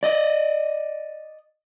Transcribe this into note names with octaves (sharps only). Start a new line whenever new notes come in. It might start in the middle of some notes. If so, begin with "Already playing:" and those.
D5 D#5